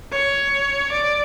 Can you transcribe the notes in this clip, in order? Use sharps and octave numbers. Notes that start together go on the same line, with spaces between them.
C#5
D5